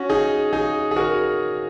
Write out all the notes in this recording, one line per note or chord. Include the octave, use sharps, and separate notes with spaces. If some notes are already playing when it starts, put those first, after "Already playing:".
Already playing: C#4 F#4
D#4 G#4
D#4 G#4
G#4
F#4 A#4